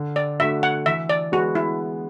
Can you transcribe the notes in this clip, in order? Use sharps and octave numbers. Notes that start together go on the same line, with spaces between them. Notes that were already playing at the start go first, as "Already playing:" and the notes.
Already playing: D3
D5
A3 D4 F#4 E5
F#5
E3 E5
D5
G#3 B3 F#4
E4